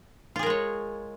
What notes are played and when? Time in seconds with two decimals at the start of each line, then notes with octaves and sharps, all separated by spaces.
0.36 F4
0.39 G#4
0.43 A#4
0.46 G#3
0.50 C#5